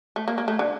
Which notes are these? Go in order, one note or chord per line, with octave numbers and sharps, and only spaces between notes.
A3
A#3
A#3
A3
D3